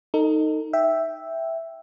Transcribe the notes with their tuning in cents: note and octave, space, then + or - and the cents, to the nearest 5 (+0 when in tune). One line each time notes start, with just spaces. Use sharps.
D#4 +0 A4 +35
E5 +0 G5 +0